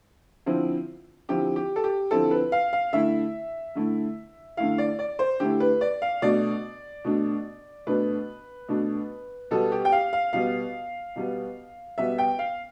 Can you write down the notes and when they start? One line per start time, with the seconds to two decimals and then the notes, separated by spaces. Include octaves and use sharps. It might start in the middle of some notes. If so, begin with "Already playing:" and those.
0.46 D3 F3 C4 E4
1.29 D3 F3 C4 E4 G4
1.56 G4
1.76 A4
1.84 G4
2.11 D3 F3 C4 E4 A4
2.31 B4
2.52 F5
2.73 F5
2.93 D3 A3 E4 E5
3.75 D3 A3 E4
4.57 D3 A3 E4 F5
4.78 D5
4.99 D5
5.19 C5
5.40 D3 A3 E4 G4
5.60 B4
5.81 D5
6.02 F5
6.22 B2 A3 D4 D5
7.05 B2 A3 D4
7.87 B2 A3 D4 B4
8.68 B2 A3 D4
9.51 B2 G3 B3 A4
9.72 G4
9.85 G5
9.92 F5
10.13 F5
10.33 B2 G3 B3 F5
11.16 B2 G3 B3
11.98 B2 G3 B3 E5
12.18 G5
12.39 F5